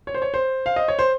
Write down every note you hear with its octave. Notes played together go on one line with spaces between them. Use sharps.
C#5
C5
C#5
C5
F5
D#5
C#5
C5